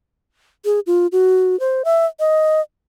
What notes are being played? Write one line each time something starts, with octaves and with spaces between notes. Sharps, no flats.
G#4
F4
F#4
C5
E5
D#5